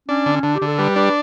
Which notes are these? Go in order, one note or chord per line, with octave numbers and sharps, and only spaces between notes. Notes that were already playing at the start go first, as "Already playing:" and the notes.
C#4 D4
D3
C#4
D3 D4
G4
D3
A4
G3 B4
D4 B4